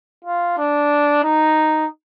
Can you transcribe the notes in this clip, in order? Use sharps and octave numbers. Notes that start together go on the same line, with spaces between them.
F4
D4
D#4